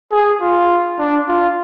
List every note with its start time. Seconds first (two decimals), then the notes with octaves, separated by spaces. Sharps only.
0.12 G#4
0.41 F4
0.99 D4
1.28 F4